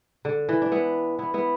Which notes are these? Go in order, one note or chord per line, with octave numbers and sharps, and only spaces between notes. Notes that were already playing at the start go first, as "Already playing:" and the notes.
D3
E3
D4
B3 E4
B3 E4
B3 E4